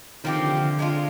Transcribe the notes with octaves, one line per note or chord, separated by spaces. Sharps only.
D#3 F3 C4 G4
D3
C3
D3
G#3 D4 F4